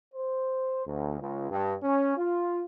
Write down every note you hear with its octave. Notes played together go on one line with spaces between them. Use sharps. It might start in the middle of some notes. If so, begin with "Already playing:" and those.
C5
D2
C#2
G2
C#4
F4